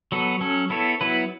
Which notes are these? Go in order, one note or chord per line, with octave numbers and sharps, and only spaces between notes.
F#3 B3 A4
F#3 C#4 A4
B3 E4 A4 C#5
F#3 B3 E4 B4